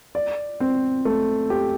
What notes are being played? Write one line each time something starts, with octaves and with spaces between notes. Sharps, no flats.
D5
C4
A3
G4